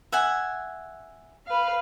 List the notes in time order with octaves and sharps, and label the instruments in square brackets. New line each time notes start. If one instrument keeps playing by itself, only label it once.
[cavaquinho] E5 F#5 G#5
[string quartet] B4 F5